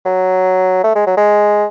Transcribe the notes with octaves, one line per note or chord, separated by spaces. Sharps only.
F#3
A3
G#3
F#3
G#3